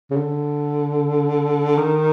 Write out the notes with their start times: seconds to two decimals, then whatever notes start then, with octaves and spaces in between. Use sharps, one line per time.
0.11 C#3
0.16 D3
1.78 D#3